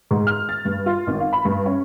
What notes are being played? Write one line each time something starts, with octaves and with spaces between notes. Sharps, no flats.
G#2
F6
A6
G2
F4
G#1
F5
B5
G2
C#4